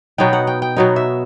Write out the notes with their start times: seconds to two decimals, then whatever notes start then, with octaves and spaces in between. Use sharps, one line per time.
0.18 B2 F#3 B3 D#4 G5
0.33 F#5
0.47 G5
0.62 G5
0.76 B2 F#3 B3 D#4
0.96 E5